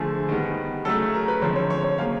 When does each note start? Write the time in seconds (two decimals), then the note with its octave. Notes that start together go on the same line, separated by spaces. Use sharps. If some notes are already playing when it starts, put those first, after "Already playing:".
Already playing: D3 F3 A3 G#4
0.29 D#3 G3 B3
0.85 C#3 F#3 A3 A4
1.14 A#4
1.28 B4
1.42 D3 F3 G#3 C4 C#5
1.56 C#5
1.70 C#5
1.84 C#5
1.98 C#3 F#3 A#3 F5